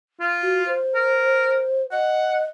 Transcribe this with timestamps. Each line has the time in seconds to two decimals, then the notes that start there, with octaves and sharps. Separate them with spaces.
0.20 F4
0.42 F#4
0.66 C5
0.95 A#4
1.92 D#5 F#5